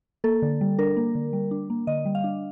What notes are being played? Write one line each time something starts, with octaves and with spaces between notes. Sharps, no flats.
A#3 A4
D3
G3
D4 A#4
A#3
D3
G3
D4
A#3
D3 D#5
G3
F5
D4